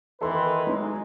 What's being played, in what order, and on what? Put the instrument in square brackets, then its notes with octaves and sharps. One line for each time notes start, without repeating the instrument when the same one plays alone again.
[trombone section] D#3 E3 B4 [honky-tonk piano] A4 C6
[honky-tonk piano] F#3 D#4 [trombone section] G#3